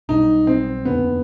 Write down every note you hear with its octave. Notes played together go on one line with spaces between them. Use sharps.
B1 B2 G3 D#4
C4
F1 D#2 D3 B3